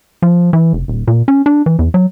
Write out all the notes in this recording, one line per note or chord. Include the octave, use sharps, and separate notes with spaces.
F3
E3
F1
D#1
A#2
C#4
D4
E3
E2
F#3